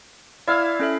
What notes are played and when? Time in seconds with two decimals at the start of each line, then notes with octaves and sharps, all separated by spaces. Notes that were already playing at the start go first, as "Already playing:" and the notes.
0.48 E4 D5 F5 E6 F6 G#6
0.80 C#4 A4 E5